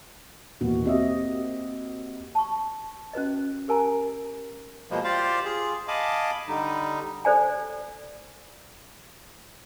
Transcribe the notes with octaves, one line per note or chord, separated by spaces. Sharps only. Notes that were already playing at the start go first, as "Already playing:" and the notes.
D#2 B2 E3 A#3 F#4
C4 F#4 G4 D#5 E5
A5 C#6
C#4 F#4 B4 D#5
G4 A#4 G#5 A#5
B2 F3 G3 G#3 A#3
F4 G4 C5 D5 F5
F4 G#4
D#5 F5 G#5 A5 B5 D6
D3 G3 D#4
A4 C5 D5 G#5